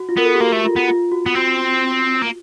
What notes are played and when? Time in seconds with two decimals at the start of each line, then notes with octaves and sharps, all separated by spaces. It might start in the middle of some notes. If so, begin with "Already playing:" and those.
Already playing: F#4
0.09 F4
0.17 B3 A#4
0.25 A4
0.35 G4
0.40 A#3 F#4
0.52 A3
0.65 F4
0.76 B3
0.88 F4
1.12 F#4
1.26 B3
1.35 C4 F#4
2.22 A#3